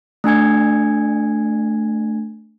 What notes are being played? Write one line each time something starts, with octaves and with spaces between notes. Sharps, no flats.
A3 D4 G#5 G#6